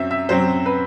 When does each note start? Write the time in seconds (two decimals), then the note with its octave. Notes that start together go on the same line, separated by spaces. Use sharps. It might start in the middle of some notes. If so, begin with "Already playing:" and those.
Already playing: F#2 F#3 C4 E5
0.11 E5
0.29 F#2 F#3 C4 C5
0.66 B4